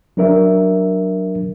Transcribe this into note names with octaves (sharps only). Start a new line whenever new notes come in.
F#3 D4 A#4 E5